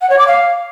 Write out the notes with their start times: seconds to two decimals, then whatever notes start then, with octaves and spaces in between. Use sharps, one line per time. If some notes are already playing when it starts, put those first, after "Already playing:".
0.01 F#5
0.10 C#5
0.18 D6
0.27 F5